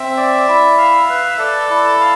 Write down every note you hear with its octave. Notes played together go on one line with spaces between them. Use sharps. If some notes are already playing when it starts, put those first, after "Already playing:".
Already playing: C4 E5
D5
E4
F5
B4
A4 D5
E4
F5